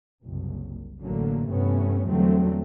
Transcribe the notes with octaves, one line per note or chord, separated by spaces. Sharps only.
F#1 C2
A1 D3 F#3 A3 A#3
G2 C3 E3 A3 B3 C#4
E2 D3 F#3 G3 A3 C4